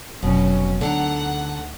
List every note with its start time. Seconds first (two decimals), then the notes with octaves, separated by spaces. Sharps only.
0.23 F1 B2 F3 F#3 C#4
0.81 D2 D3 D#4 A4 F#5 A#5